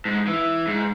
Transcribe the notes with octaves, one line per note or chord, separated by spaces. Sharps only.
G#2
E3
G#2